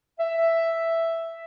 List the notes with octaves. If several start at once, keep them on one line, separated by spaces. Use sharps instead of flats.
E5